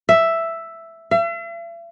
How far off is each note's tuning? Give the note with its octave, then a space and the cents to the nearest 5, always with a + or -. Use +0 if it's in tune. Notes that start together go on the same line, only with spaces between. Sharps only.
E5 +5
E5 +45